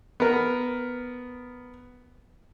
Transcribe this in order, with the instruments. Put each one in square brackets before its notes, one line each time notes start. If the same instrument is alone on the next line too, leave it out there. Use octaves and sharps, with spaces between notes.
[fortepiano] B3 A#4